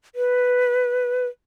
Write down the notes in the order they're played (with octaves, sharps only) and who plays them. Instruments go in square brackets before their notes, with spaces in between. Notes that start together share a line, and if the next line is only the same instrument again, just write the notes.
[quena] B4